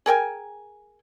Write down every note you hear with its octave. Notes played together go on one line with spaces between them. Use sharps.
G#4 A#4 G5 G#5